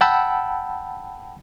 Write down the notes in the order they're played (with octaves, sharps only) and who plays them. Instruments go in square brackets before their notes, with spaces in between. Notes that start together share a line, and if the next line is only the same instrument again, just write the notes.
[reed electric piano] F#5 G5 A5 B5 E6